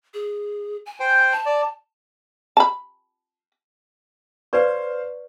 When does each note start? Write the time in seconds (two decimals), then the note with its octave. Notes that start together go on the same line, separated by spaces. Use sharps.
0.14 G#4
0.86 G#5
1.00 C5 G5
1.32 A5
1.46 D5
2.57 A5 B5
4.53 B4 C5 D5 F5 C#6